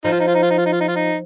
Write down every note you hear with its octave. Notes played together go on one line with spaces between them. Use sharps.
F3 D#4
F4
D#4
F4
D#4
F4
D#4
F4
D#4
F4
D#4
F4
D#4